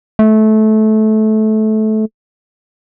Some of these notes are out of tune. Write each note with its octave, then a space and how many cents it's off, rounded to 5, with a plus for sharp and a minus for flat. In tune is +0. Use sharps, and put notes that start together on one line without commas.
A3 -20